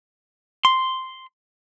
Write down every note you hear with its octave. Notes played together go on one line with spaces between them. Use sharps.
C6